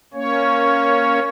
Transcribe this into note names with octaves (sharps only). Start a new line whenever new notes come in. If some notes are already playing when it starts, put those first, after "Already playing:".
A#3 C#4 C#5